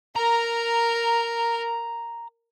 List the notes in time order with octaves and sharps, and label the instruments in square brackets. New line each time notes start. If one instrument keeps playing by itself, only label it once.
[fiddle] A#4 [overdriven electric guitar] A#5